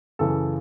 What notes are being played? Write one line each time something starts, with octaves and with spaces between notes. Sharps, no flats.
F#2 C#3 E3 A4